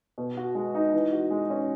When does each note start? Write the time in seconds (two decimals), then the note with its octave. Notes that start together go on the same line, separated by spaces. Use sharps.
0.18 B2
0.37 F#4
0.55 G#3
0.75 D#4
0.93 E3
1.13 F#4
1.30 G#3
1.50 C#4